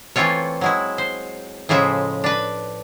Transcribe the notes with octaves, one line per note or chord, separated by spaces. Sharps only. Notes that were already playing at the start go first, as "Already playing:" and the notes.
E3 A3 C4 F4 C#5
F#3 G#3 E4
C5
A2 C#3 F3 G#3 E5
D4 B4